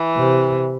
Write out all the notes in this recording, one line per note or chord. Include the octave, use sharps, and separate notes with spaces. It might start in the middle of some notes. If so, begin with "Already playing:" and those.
Already playing: E3
C3